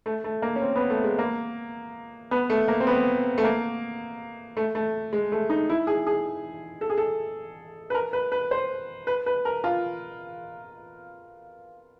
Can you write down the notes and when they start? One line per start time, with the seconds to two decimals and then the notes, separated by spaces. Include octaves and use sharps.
0.06 A3
0.24 A3
0.42 A#3
0.56 C#4
0.62 C4
0.76 B3
0.90 A3
1.04 G#3
1.19 A#3
2.31 B3
2.50 A3
2.68 A#3
2.80 C4
2.87 B3
3.38 A3
3.44 A#3
4.57 A3
4.75 A3
5.13 G#3
5.32 A3
5.50 D#4
5.70 E4
5.87 G#4
6.07 G#4
6.81 A4
6.90 G#4
6.98 A4
7.90 B4
7.95 A#4
8.13 B4
8.32 B4
8.51 C5
9.07 B4
9.26 B4
9.45 A#4
9.64 F4